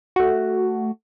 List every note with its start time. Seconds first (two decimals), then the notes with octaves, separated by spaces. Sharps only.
0.16 A3 F#4